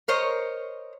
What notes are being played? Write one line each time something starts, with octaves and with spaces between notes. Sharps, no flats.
A#4 C5 C#5 D#5